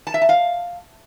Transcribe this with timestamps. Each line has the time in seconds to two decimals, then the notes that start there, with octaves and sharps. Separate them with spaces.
0.07 A5
0.14 E5
0.21 A5
0.29 F5